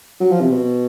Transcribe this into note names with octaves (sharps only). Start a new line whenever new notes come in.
F#3
F3
C3
B2